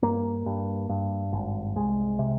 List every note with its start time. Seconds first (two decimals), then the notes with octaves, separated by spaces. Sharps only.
0.03 G2 A#3
0.46 G2
0.89 G2
1.32 G#1
1.76 C2 G#3
2.19 C3